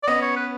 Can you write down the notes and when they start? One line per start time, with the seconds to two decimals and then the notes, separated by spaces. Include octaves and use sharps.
0.04 D5
0.07 B3 C#4 D#5
0.22 C#5
0.36 B4